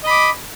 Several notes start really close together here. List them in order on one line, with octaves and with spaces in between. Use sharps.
D#5 B5 D6